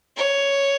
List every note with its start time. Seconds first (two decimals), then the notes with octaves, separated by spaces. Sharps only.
0.17 C#5